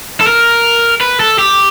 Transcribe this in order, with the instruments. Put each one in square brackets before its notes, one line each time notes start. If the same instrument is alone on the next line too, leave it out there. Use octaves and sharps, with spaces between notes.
[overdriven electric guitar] A4
A#4
B4
A4
G4